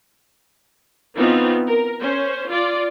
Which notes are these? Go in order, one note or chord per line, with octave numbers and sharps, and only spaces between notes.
E3 B3 C4 D#4 F4
A#4
C#4 C5
F4 D5